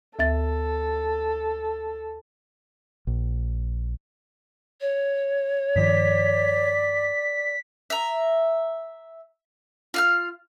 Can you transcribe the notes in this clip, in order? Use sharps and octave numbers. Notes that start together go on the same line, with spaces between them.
D2 A4 E5 A6
A#1
C#5
G2 D#3 F3 D5 B6
E5 A#5
F4 F5 F6